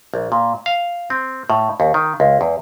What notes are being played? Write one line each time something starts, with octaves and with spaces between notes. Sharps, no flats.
A#1
A#2
F5
C4
A2
D#2
D#3
C#2
E2